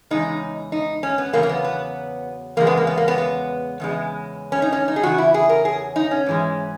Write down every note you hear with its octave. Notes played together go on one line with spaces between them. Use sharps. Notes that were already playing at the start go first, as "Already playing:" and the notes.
E2 C#3 G#3 D#4
D#4
C#4
B3
E2 C#3 F#3 A#3
A#3
B3
B3
E2 C#3 G#3 A#3
B3
A#3
B3
A#3
B3
B3
E2 C#3 G#3
C#4
D#4
C#4
D#4
G#4
E2 C#3 F#3 F#4
E4
G#4
A#4
G#4
D#4
C#4
G#2 E3 G#3